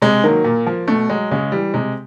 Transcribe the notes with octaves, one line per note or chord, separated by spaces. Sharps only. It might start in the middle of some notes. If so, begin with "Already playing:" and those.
C3 G#3
D#3 F#3 A#3
A#2
F3
B2 A3
F#3 G#3
C#3 G#3
E3 G3
C3 G#3